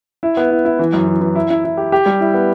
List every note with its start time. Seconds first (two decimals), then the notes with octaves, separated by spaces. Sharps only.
0.23 E4
0.37 B3
0.50 E4
0.65 E4
0.79 E3
0.93 F#2
1.08 E3
1.21 E3
1.35 E4
1.50 E4
1.64 E4
1.77 G4
1.92 G4
2.06 G3
2.20 E4
2.34 B3